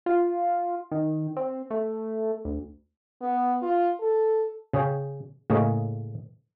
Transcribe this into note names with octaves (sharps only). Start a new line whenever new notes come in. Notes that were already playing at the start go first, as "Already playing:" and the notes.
F4
D#3
C4
A3
D2
B3
F4
A4
C#3 G#4 C#5 G5
A2 C#3 A#3 G#4 C#5 D#5